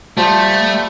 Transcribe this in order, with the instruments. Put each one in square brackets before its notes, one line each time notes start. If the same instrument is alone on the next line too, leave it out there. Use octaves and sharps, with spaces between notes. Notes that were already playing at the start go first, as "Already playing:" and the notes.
[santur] F3 [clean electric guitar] G3 [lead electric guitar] A3